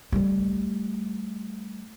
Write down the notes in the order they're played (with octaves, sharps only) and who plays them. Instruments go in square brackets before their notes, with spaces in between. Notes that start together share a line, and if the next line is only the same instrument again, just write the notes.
[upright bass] G3 A3